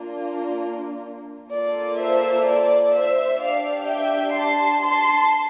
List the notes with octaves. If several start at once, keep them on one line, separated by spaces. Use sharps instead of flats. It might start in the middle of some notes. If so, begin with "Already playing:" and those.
Already playing: A#3 D4 F4
A#3 F4 A4 D5
C5 E5
D5
C5 E5
D4 G4 D5 F5
E5 G5
A5 C6
A5 C6